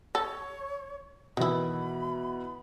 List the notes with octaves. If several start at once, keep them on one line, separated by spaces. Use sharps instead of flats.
A4 C#5
B2 D#3 E3 E4 B5